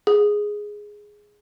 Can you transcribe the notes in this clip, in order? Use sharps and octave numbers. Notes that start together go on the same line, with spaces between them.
G#4